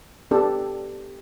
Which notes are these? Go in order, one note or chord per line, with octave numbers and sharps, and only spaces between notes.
B3 D4 G4 A4